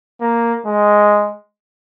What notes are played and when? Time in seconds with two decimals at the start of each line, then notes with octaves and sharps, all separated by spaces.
0.21 A#3
0.66 G#3